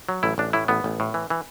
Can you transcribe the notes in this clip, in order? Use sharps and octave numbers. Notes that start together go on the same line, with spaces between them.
F#3
A1 E4
A1 D4
A2 E4
A1 B3
A1
A2
E3
E3